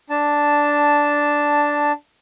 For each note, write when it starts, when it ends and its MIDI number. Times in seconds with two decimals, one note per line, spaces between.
0.10 1.92 62
0.10 1.92 81